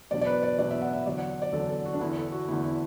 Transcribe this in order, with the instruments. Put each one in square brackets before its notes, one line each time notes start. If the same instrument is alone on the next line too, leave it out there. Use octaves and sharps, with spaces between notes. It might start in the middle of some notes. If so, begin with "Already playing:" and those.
[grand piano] E2 B2 F#3 D4 [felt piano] D5
[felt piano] D5
B4
D5
[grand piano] E2 B2 F#3 D4 [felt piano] D5
[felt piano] E5
F#5
E5
[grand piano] E2 D3 F#3 [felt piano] D5
[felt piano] F#5
D5
[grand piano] E2 D3 F#3 [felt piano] A4
[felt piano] A4
F#4
D4
[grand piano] E2 D3 B3 [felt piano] E4
[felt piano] A4
F#4
[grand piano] E2 D3 B3 [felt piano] E4
[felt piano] E4